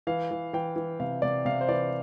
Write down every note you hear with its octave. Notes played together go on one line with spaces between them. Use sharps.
E3 F5
E3
E3 G5
E3
C3 F5
C3 D5
C3 F5
C5
E3 D5